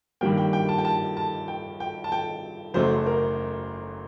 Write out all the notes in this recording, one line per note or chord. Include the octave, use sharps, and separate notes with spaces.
G2 D#3 G3 A#3 G5
G5
G5
A5
G5
A5
A5
G5
G5
A5
G5
F#1 F#2 F#3 A3 C5
A#4